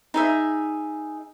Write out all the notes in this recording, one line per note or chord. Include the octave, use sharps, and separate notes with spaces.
D#4 G#4 E5